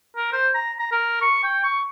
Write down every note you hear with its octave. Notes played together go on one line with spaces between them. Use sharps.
A#4
C5
A#5
A#5
A#4
C#6
G5
C#6